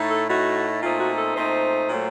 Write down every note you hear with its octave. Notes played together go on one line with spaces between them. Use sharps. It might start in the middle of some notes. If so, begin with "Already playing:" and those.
Already playing: A2 A3 D#4
A4
A2 A3 D#4 F#4
A#2 A3 C4 D#4 F4
F#4
A4
A#2 A3 C4 D#4 C5
A#2 F#3 A3